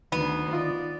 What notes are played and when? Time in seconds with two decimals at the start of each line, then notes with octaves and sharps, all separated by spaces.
0.12 D2 D#3 B3
0.53 F4 D5 D#5